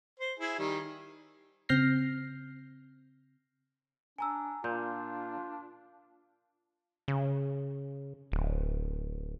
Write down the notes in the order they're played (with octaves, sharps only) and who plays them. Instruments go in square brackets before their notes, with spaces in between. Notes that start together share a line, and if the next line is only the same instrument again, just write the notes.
[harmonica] C5
E4 G#4
D#3 G3
[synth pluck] C#3 C4 F6 G6 A#6 C7
[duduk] D4 [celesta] G#5 A#5 E6
[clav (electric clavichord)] A#2 [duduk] D4 [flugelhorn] F4 [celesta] G6
[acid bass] C#3
D1